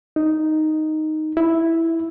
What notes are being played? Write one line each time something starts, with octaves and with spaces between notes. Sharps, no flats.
D#4
E4